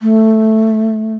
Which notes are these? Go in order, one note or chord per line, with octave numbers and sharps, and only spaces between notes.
A3